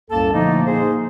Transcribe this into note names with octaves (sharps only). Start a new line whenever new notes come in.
C2 F#2 A2 A#3 A4 A5
A#2 D3 F3 A3 A#3 D#4
A#3 D#4 G#4 C5